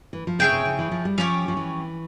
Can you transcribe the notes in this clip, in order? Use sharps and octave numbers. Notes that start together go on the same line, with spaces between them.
E3
F3
C#3 E4 G#4 C#5 G5
C3
C#3
E3
F3
G3
F3 C#4 G4 C#5
F3
E3